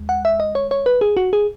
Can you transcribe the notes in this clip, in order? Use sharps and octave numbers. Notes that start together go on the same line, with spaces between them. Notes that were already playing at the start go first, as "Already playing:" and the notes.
Already playing: D#2 G#3
F#5
E5
D#5
C#5
C#5
B4
G#4
F#4
G#4